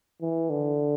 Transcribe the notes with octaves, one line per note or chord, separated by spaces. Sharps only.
E3
D3